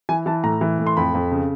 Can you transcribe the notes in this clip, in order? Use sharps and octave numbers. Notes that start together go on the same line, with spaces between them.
E3 G#5
E3 A5
A2 A#5
E3
A2
C6
F2 B5
F2
C#3